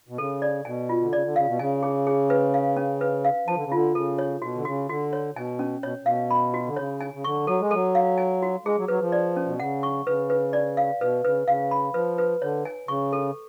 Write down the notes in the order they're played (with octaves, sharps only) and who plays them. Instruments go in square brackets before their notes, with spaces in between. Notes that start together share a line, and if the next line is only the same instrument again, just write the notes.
[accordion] B2
[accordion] C#3 [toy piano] A4
[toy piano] D5
[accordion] B2 [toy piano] G#5
[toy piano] F4
[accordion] D3
[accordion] C#3 [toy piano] D5
[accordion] D3
[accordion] C#3 [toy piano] F5
[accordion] B2
[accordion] C#3 [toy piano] G#5
[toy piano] G#4
G#4
B4
F5
C#4
B4
F5
[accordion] F3 [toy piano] A5
[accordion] D3
C#3
[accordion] D3 [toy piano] F4
[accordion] C#3 [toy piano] A4
[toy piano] C#5
[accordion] B2 [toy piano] F#4
[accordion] D3
[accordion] C#3 [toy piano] F#4
[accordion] D3 [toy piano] F#4
[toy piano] C#5
[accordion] B2 [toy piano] G#5
[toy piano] C#4
[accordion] B2 [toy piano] C#5
[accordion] B2 [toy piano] F5
[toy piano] B5
F#4
[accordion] D3
[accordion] C#3 [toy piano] C#5
[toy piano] G#5
[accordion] C#3
[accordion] D3 [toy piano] C#6
[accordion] F#3 [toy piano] A4
[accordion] G#3
[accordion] F#3 [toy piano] A4
[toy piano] F5
G#5
F#4
[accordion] G#3 [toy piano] G#4
[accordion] F#3
[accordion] F#3 [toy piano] B4
[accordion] F3
[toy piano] D5
C#4
[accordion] B2
[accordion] C#3 [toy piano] F#5
[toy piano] C#6
[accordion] C#3 [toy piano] B4
[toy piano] B4
D5
F5
[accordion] B2 [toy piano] B4
[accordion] C#3 [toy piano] B4
[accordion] C#3 [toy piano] F5
[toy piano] B5
[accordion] F3 [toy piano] B4
[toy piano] B4
[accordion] D3 [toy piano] C#5
[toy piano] G#5
[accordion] C#3 [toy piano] C#6
[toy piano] A4